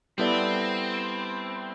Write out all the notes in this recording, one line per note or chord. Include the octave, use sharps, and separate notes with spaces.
G3 B3 C4 E4 A4 D5